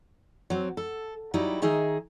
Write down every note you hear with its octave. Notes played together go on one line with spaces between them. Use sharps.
F#3 C4
A4
F#3 G3 D#4 E4 G4
D#3 D#4 G#4 E5